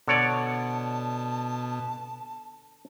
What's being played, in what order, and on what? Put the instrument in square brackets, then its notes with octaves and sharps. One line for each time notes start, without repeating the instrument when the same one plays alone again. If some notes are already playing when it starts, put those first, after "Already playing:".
[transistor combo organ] B2 [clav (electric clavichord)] D3 C#5 D5 [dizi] A5